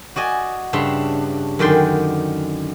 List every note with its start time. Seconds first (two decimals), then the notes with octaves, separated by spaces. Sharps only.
0.16 F#4 D5 D#5 G#5
0.73 G2 C#3 D4 E5 C6
1.59 F#2 D3 D#3 D5 G5 C6